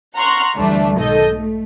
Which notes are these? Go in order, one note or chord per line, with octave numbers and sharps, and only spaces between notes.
F#5 A#5 C6 C#6 F6 F#6
D2 E3 G3 A3 D4
B1 G#2 D#3 A4 D#5 G6
A3